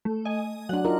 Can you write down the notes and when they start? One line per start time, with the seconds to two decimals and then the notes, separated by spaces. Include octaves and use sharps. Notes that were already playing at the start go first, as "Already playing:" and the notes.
0.05 A3
0.25 D#5 G#5
0.69 F#3 D4 F#5
0.85 D#4 F4 A#4